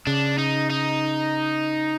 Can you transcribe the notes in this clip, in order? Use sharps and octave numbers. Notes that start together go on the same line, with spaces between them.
C#3 D4
D#4
D#4